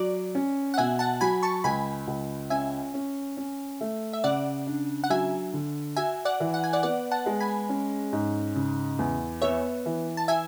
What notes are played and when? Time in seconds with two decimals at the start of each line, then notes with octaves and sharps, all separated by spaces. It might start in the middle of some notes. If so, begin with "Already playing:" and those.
Already playing: F#3 D5
0.35 C#4
0.74 F#5
0.78 B2 E5 G#5
0.99 F#5 A5
1.21 F#3 G#5 B5
1.43 A5 C#6
1.64 C#2 G#5 B5
2.07 C#2
2.50 C#4 E5 G#5
2.94 C#4
3.37 C#4
3.81 A3
4.13 E5
4.24 C#3 D5 F#5
4.67 D4
5.04 F#5
5.10 F#3 E5 G#5
5.53 D3
5.96 F#4 E5 G#5
6.25 D5 F#5
6.40 E3
6.54 F#5
6.64 G#5
6.73 D5 F#5
6.83 B3 D5 F#5
7.11 F#5 A5
7.26 G#3
7.40 G#5 B5
7.69 C#4
8.13 G#2
8.56 C#3
8.99 E2
9.42 B3 C#5 E5
9.86 E3
10.17 A5
10.28 E4 E5 G#5